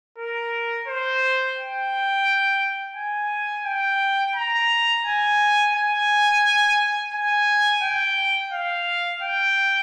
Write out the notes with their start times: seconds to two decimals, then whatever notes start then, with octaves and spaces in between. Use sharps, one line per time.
0.18 A#4
0.88 C5
1.57 G5
2.96 G#5
3.66 G5
4.36 A#5
5.05 G#5
5.75 G#5
7.14 G#5
7.83 G5
8.53 F5
9.22 G5